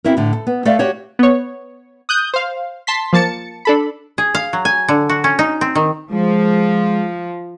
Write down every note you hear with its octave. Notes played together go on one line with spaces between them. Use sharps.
C4 C#4 E4 F#4 A#4
A2 D3
A4
B3
A3 A4 D5 E5 F5
F#4 G4 C#5
B3 C#5
D#6 F#6 G6
C5 F5
A5 C6 B6
F3 A#3 A5 A6 C#7
D4 A4 B5
G#4
F5
F#3
G#5
D3
F#4
C#4
D#4
C4
D#3
F3 G#3